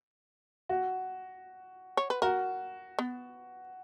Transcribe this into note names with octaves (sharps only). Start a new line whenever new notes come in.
F#4
C#5
B4
F#4 A#4
B3